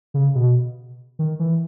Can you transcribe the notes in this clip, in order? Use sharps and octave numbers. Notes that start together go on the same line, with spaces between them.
C#3
B2
D#3
E3